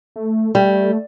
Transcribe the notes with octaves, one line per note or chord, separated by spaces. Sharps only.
A3
G3 A3